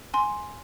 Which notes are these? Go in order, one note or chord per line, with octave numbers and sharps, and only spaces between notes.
G#5 C6